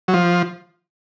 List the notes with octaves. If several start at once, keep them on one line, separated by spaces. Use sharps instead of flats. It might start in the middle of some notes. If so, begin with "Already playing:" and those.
F#3
F3